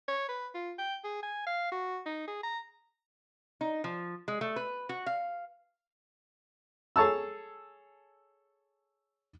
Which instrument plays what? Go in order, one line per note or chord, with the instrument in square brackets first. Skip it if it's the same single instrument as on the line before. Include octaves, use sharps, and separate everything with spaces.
[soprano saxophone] C#5
B4
F4
G5
G#4
G#5
F5
F#4
D#4
G#4
A#5
[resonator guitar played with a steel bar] D#4
F3
G#3
A3
B4
F#4
F5
[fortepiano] G#4 A4 C#5 A5 E6